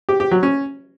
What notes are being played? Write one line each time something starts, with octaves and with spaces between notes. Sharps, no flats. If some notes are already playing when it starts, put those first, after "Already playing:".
G4
G4
F#3
C#4